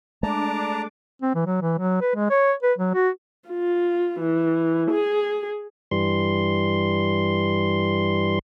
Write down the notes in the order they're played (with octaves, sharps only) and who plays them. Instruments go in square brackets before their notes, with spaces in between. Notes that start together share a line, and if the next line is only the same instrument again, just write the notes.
[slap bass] G#3 A3 [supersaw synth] D4 D6 [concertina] A5 A#5
[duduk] C4
E3
F#3
E3
F#3
B4
G#3
C#5
B4
F#3
F#4
[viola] F4
E3
G#4
[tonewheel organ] G2 E3 G3 C6